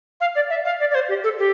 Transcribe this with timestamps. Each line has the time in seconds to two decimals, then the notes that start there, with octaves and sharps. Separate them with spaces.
0.20 F5
0.35 D5
0.49 E5
0.65 F5
0.80 D5
0.90 D5
0.94 C5
1.08 G4
1.23 A4
1.38 G4